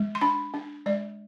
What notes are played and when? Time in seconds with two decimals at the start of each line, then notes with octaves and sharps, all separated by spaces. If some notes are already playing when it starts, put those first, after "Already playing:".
Already playing: G#3
0.15 C6
0.21 D4 B5
0.54 D4
0.86 G#3 D5